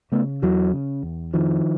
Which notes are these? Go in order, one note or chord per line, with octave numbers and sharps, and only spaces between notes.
C#3 A3 B3
E2 E3 F#3
C#3
E2
F2 D#3 F3